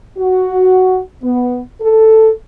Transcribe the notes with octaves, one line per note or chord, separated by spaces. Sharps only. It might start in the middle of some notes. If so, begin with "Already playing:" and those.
F#4
B3
A4